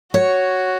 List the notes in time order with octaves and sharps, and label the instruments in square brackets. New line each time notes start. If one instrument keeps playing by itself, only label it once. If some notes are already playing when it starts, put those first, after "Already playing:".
[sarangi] F#4 [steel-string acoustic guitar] C#5